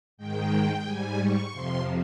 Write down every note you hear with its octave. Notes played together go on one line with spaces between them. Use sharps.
G#2 D#3 G#3 G5
G#2 G3 G#5
C#6
F2 C3 F3 C6